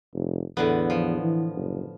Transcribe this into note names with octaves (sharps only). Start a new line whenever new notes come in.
F1
E2 A2 D3 B3
F3
E3
F#1